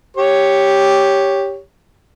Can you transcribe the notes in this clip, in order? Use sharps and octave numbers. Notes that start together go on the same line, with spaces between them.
G4 C#5